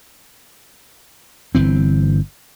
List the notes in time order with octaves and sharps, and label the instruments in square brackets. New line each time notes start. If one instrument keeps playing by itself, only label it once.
[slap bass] G1 E3 C4